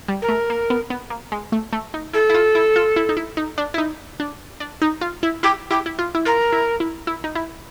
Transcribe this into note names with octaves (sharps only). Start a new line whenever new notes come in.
G3
A#4
A3
A#3
B3
B3
A#3
G#3
A3
A3
D#4
E4 A4
E4
F4
E4
F4
E4
D#4
E4
D#4
D4
E4
D#4
D4
D4
D#4
F4
E4
E4 G4
E4 G4
E4
F4
E4
F4 A#4
E4
E4
E4
D#4
E4